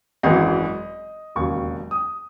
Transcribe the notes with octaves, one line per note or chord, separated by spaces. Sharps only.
G#1 F#2 E3 G#3 D#5
E1 D#2 C#3 F#3 C#6
D#6